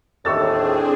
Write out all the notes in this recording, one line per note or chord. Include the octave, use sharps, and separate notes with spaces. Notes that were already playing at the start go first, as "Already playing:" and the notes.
D#2 A2 C4 D4 G#4 C#6 E6 A6